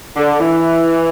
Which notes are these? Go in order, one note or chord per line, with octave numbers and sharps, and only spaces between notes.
D3
E3